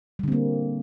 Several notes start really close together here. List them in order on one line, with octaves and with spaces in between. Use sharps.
G3 D3 C4 A#3